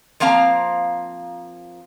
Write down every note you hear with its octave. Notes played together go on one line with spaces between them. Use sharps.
F3 A#3 C4 F5 A#5